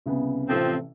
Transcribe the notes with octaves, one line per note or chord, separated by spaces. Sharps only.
C2 C#3 B3
A1 C3 F3 C4 A4